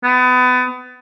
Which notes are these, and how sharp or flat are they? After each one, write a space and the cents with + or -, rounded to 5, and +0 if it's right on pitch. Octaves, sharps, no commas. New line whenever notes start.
B3 +30